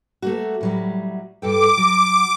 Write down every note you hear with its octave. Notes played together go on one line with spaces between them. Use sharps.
A3 A#3 F#4
A2 F#3 G3
G2 A4 G5 D6
F#3